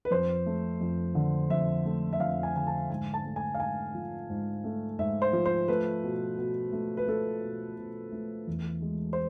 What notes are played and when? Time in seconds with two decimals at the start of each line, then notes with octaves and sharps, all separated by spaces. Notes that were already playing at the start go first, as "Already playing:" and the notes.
0.05 B4
0.11 F2 C5
0.46 A3
0.81 F2
1.15 D3
1.50 F2 E5
1.85 A3
2.13 E5
2.20 F2 F5
2.43 G#5
2.54 D3 G#5
2.67 A5
2.90 G#2 G#5
3.14 A5
3.25 A3
3.36 G#5
3.54 F5
3.60 G#2 G#5
3.94 F3
4.30 G#2
4.64 A3
4.99 G#2 E5
5.22 C5
5.33 F3
5.46 C5
5.68 A3 B4
6.04 B2
6.38 B2
6.72 A3
6.97 B4
7.08 A3 A4
7.43 B2
7.78 B2
8.12 A3
8.47 E2
8.82 G#3
9.13 C5